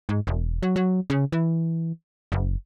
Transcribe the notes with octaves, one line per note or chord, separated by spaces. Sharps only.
G#2
E1
F#3
F#3
C#3
E3
F#1